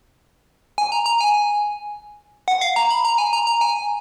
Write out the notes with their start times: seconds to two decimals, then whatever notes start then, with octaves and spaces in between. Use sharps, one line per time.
0.78 G#5
0.92 A#5
1.06 A#5
1.20 G#5
2.48 F#5
2.61 F5
2.76 A#5
2.90 B5
3.05 A#5
3.18 G#5
3.33 A#5
3.47 A#5
3.61 G#5